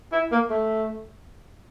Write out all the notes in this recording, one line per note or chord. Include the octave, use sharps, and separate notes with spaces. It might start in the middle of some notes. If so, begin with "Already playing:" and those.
E4
A#3
A3